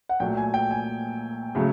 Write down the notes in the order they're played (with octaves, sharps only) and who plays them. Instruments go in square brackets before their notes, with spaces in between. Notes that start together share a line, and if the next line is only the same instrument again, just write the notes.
[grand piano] F#5
A#2 F#3 A3 G5
G#5
G5
G#5
C#3 F#3 A3